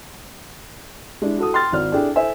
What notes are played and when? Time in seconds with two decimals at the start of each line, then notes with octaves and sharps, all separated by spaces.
1.22 G#3 D4 E4
1.38 F#4 A4 D#6
1.53 G5 C6 F6 A6
1.72 G#1 D5 F6
1.92 D4 E4 G#4 A4 G5
2.16 A4 C5 E5 G#5